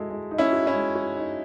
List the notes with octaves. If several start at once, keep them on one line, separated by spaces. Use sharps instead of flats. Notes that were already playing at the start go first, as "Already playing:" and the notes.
Already playing: G#3 E4 F#4 A4
G#3
D#4
C#4 E4
F#4
C#4 E4
G#3
F#4
D#4